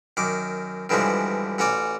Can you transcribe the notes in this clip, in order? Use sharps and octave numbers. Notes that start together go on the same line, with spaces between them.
F#2 D#3 D6
G2 D3 E3 F3 G#3 F#4
A1 C#4 F#4 D5